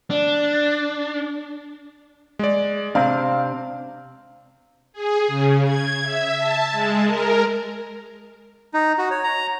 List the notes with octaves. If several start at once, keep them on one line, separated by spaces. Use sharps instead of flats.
D4
G#3 D5
C3 C4 D4 F5
G#4
C#3
G#6
E5
A5
G#3
A#4
D#4
F#4
C#5
A#5